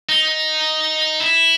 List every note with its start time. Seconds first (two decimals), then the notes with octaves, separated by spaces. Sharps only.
0.09 D#4
1.20 E4